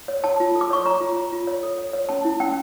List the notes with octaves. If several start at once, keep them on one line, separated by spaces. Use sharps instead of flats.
C#5
C#5 A5
F4
A4
D6
C#5 C#6
C#5 A#5
F4
C#5
F4
C#5
A4
C#5
C#5
C#4 A5
E4
C#4 G5